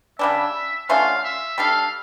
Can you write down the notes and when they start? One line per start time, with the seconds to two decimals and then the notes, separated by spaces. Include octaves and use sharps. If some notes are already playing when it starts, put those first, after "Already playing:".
0.19 C#3 G3 D4 E5
0.89 D3 A3 C#4 F4 F5
1.24 E5
1.58 G3 D4 A4 F5